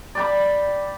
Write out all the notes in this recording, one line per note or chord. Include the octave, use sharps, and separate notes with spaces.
D5 G5 B5